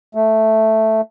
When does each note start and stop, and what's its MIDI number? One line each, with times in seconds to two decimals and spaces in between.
0.15 1.01 57